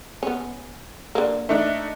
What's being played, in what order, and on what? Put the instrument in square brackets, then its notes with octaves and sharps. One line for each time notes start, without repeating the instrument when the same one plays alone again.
[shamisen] B3 C#4
D3 A#3
[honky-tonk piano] A3 D4 D#4